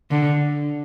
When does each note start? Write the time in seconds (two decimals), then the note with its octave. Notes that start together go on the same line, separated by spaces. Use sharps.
0.11 D3